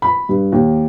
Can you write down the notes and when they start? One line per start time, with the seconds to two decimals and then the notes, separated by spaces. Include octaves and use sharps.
0.02 B5
0.29 G2
0.52 D#2